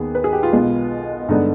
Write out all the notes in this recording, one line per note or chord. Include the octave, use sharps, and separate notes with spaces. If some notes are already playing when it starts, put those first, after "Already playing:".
Already playing: D#2 D#3 B3 G#4
B4
G#4
G4
F4
B1 B2 G#3 B3
G2 D3 G#3 B3 D#4